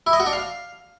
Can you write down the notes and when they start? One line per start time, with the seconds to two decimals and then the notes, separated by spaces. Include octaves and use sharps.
0.07 E4
0.13 D#5
0.20 F#4
0.26 D4
0.33 F5